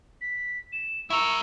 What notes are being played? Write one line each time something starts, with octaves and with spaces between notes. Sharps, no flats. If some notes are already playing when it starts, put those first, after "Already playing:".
B6
E7
E4 A#4 C#6 E6